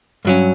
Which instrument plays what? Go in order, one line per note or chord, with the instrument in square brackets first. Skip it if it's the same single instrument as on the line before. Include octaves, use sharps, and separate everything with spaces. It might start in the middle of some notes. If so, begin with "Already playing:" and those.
[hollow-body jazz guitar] G2 F#3 C#4